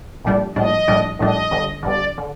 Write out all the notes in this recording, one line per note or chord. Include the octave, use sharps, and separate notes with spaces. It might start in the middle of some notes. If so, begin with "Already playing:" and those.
A#1 A2 G3 D4
A#1 A2 G3 D4 D#5
A#1 A2 G3 D4
A#1 A2 G3 D4 D#5
G1 G2 D3
G1 G2 D3 D5
D3